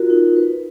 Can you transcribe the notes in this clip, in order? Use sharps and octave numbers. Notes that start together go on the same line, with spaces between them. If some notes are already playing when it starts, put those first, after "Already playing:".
Already playing: F4 F#4 A#4
D#4
B4